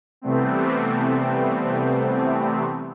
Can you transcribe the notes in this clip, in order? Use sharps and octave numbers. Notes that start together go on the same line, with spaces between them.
C3 E3 G3 A3 B3 C4